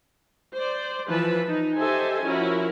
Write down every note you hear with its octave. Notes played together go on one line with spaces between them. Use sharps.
C5 D5
E3 F3 B4 A5 B5
D#4
G4 A4 C5 D#5 E5 G#5
F3 C#4 E4 F#4 A#4